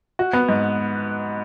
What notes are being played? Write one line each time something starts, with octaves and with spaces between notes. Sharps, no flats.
F#4
B3
G#2